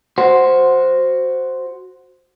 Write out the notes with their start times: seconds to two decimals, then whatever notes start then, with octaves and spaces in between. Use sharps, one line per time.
0.18 F#4 C5